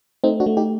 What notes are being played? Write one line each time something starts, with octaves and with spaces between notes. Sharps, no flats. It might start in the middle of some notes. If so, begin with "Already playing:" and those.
A3 C4 D#4
D4 F#4
A3
D#4 G4